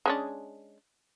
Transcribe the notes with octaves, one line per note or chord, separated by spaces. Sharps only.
G#3 C#4 D4